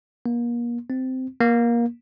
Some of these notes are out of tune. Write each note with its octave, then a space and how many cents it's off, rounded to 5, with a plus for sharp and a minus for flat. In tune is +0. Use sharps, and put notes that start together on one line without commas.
A#3 +35
C4 -15
A#3 +20